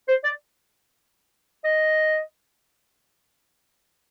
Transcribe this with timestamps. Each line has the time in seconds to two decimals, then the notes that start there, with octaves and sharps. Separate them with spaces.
0.08 C5
0.24 D5
1.64 D#5